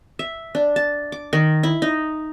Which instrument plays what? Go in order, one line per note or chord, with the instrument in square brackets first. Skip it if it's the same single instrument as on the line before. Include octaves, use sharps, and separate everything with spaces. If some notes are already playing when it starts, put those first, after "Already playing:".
[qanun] E5
D4
A5
D6
D#3
E4
D#4